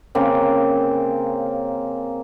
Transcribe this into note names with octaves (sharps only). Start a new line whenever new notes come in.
C#3 A#3 C4